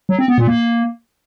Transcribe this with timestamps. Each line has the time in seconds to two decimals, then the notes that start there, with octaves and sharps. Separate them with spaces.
0.09 F#3
0.19 C4
0.28 B3
0.38 A#2
0.47 A#3